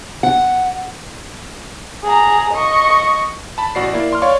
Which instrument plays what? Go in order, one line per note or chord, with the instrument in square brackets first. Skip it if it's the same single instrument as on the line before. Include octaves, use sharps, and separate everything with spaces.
[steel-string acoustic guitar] F#5
[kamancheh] G#4 A#5
D#5 C#6
[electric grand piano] A5 B5
A1 F#4 D5 C7
A#3 E4 D5
D5 C6 F6
C#5 D5 F5 C6 C#6